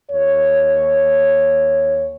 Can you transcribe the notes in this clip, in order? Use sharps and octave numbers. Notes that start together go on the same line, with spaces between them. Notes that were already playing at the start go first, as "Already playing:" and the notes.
D#2 C#5